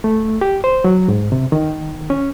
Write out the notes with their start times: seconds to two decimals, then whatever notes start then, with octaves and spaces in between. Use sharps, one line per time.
0.04 A3
0.41 G4
0.64 C5
0.84 F#3
1.08 G#2
1.32 C3
1.52 D#3
2.10 C#4